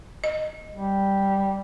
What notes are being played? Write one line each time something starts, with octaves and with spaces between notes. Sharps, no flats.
D#5
G3